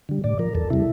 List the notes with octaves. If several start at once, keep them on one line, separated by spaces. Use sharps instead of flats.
D3 G3
A2 D5
F3 A#4
E2 A4
C3 G3 E4